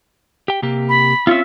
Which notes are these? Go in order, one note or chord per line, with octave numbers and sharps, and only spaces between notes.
G4 G5
C3 A#3 G4
B5
C4 C#4 F4 E5